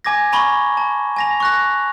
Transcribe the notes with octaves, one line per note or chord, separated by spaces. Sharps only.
G#5 D6 G#6 A#6
G#5 A#5 B5 C#6 G7
A5
G#5 A#6 F7
C#6 F#6 A#6